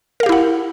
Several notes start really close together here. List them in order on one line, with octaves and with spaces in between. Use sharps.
A#4 F5 G4 E4 F#5